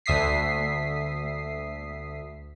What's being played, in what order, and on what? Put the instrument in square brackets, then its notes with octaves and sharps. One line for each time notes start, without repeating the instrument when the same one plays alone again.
[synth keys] D2 E5 D#6 B6 C7